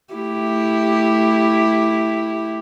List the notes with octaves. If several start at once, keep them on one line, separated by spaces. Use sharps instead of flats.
A3 E4 G4